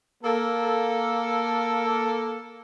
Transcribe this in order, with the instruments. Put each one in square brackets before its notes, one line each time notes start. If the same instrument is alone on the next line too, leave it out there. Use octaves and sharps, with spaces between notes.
[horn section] A#3 A4